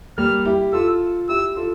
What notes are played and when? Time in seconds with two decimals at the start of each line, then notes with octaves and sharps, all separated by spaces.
0.18 G3 A#3 F6
0.45 E4 G4
0.73 F4 A4 E6
1.29 E4 G4 E6
1.56 F4 A4